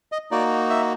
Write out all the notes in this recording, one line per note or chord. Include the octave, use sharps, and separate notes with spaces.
D#5
A#3 D#4 F#4 D5
E5